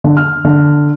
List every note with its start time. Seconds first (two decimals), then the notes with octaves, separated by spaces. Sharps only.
0.04 D3
0.17 F6
0.45 D3